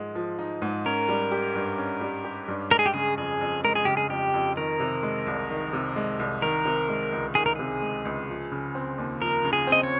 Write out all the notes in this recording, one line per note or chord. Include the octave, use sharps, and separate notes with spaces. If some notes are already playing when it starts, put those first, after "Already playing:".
Already playing: G#2 F3 G#3
F3
D#4
G#2
C#4 A#4
G3
G4
G2
C#4
G3
G4
G2
G#3 A#4
G#4
G4
C#3 G#4
F2 G#4
F2
G#3 A#4
G#4
C#3 G4
G#4
F2 G4
F2
D#3 A#4
C3
G#3
C2
D#3
C3
G#3
C2
D#3 A#4
C3
G#3
C#2
D#3 G#4
A#4
C3 G#4
G#3
C#2
F3
C#3
C4
D#2
F3 A#4
C#3
G#4
C4
D#5
C#5